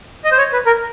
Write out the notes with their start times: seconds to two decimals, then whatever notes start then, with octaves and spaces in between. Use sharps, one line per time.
0.25 D#5
0.32 C5
0.38 C#5
0.53 B4
0.66 A#4